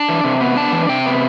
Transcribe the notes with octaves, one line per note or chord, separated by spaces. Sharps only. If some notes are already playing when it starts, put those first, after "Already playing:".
Already playing: D4 A5
E3
C3
B3
D4 A5
E3
C3 G5
B3